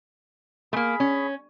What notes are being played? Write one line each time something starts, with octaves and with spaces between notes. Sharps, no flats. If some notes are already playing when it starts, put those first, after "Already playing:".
A3 A#3 G#4 B5
C#4